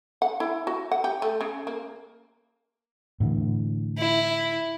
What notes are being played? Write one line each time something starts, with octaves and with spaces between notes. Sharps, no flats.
F#5
E4
F#4
F#5
G4
A3
C#3
A#3
A2 D3 E3
E4